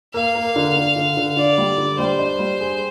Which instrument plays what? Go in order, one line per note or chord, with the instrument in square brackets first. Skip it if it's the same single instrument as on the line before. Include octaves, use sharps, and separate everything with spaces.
[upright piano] A#3 [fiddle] F5
[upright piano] A#3
D3
D3
D3
D3
[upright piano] D3 [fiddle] D5
[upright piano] G3
D3
[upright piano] G3 [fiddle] C5
[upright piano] D4
G3
G#4